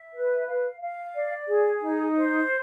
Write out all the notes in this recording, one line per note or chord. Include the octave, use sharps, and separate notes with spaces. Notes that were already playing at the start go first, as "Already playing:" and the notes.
Already playing: E5
B4
F5
F5
D5
G#4
D#4
C5